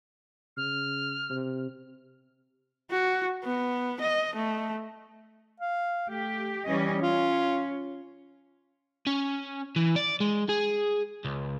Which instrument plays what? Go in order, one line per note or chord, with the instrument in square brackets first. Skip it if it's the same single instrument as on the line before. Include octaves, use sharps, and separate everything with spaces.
[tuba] C#3 [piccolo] F6
[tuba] C3
[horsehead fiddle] F#4
B3
D#5
A3
[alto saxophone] F5
[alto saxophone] A3 [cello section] G4
[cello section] E3 C#4 D#5 [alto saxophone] G3
[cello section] C#4 [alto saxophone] F4
[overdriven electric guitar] C#4
E3
D5
G#3
G#4
C#2